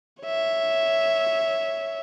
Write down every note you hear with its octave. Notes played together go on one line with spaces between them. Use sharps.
C#5 E5